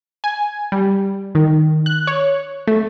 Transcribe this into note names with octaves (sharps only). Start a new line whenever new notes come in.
G#5
G3
D#3
F#6
C#5
A3